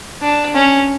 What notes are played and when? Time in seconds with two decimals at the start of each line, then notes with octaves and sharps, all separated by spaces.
0.22 D4
0.54 C#4